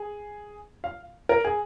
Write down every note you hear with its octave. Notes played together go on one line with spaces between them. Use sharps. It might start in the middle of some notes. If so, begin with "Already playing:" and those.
Already playing: G#4
F5
A#4
G#4